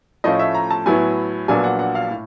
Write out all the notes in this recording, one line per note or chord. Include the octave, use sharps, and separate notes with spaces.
A2 F3 A3 C#4 F4 D#5
E5
A#5
A5
A2 F#3 B3 E4 G#5
A#1 A#2 F#3 B3 D4 G#5
F#5
F#5
F5
A2